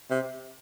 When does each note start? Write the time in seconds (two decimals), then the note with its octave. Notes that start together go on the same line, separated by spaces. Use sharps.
0.10 C3